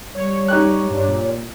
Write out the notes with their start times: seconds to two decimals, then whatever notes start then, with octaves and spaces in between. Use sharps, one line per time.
0.15 G3 C#5
0.48 D#4 G4 F#6
0.90 G2 D4 C#5
1.07 A#2